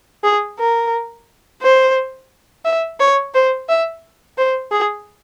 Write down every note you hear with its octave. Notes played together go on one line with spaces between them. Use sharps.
G#4
A#4
C5
E5
C#5
C5
E5
C5
G#4